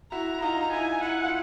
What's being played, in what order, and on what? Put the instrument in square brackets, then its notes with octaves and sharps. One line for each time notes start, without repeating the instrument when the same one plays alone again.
[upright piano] E4 F#4 [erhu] A#5
[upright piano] E4
[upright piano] D#4 F4 [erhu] A#5
[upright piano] D#4
[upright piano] E4 [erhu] G#5
[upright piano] E4 [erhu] F#5
[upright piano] F4